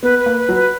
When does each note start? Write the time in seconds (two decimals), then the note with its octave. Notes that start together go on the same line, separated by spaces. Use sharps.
0.03 B3 B4
0.20 B4
0.26 A#3
0.37 B4
0.49 F#3
0.55 B4